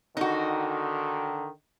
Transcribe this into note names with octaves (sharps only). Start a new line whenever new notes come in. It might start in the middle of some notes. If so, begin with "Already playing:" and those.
D3 D#3 D#4 F#4